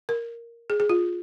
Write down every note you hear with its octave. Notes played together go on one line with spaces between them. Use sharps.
A#4
G#4
G#4
F4